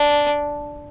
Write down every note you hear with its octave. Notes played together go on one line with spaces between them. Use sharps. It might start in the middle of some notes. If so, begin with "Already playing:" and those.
Already playing: D4